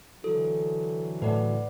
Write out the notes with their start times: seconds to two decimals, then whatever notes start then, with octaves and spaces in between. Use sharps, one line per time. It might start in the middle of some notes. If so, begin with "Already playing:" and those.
0.24 D3 E3 F#3 A4
1.22 A2 B4 D5 F#5